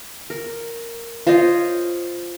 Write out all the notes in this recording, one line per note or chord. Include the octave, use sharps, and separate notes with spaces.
A#4
F4 C5 C#5 D#5